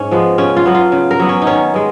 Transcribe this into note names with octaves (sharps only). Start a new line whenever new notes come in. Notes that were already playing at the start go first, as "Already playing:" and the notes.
Already playing: G#2 C#4
F3 G#3 B3
C#3 C#4
F4
F#3 B3
F4
C#3
A#4
F#3 B3
C#4
D#4
D#3 C#4
G#3 B3